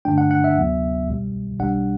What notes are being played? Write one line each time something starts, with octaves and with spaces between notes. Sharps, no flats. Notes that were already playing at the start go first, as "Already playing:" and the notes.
G2 D3 A3 D4 G5
F#5
F#5
E5
D2 C3 F#3 B3
C2 B2 G3
B1 B2 G3 D4 F#5